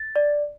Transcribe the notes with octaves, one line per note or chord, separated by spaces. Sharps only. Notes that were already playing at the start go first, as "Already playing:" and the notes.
Already playing: A6
D5